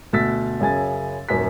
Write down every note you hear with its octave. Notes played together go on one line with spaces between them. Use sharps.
D2 B2 E6 A6 B6
F#2 C#3 G#5 A6
D#1 F#2 B6